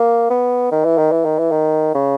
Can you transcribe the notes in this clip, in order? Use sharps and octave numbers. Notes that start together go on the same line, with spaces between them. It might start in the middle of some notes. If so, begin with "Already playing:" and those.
Already playing: A#3
B3
D#3
E3
D#3
E3
D#3
E3
D#3
C#3